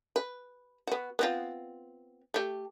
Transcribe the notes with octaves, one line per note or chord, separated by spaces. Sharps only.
B4
B3 F#4
B3 C4 F4
A3 G4